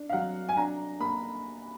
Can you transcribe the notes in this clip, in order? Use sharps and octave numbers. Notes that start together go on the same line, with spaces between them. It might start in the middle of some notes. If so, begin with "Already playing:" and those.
Already playing: D4
F5
F#3 F#5
G#5
D4 A#5
A#3 B5